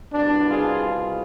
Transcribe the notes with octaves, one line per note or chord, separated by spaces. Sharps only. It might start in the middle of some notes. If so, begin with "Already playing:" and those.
C2 B2 B3 D4
F4 G#4